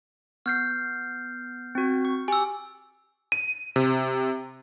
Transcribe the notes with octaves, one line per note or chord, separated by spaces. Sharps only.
B3 F6 G6 C7
C4 F#4
C#6
G4 G#5 E6
D#7
C3